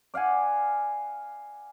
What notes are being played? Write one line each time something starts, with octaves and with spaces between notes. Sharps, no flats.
D5 F5 F#5 G#5